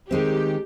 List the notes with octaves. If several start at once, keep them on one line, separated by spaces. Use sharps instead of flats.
D#3 G#3 C4 G4